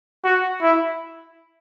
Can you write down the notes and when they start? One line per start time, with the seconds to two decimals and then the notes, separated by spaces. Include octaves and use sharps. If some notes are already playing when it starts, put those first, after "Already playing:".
0.24 F#4
0.61 E4